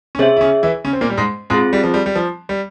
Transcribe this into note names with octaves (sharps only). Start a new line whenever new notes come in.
C#4
C3 C4 G#4 C#5 E5
E4
C#3 C#4
E3 E4
C#3 C#4
C4
A#2 A#3
G3
G#2 G#3
G#2 G#3 C4 F4 G#4
G3
F3
G3
G3
F3
G3